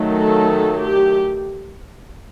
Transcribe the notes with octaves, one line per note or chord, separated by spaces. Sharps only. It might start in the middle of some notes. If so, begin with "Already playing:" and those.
Already playing: D#3 F#3 A3
A4
G4